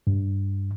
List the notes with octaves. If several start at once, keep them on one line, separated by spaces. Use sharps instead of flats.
G2